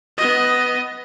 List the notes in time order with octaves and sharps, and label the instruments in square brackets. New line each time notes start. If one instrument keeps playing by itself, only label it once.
[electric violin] B3 D#5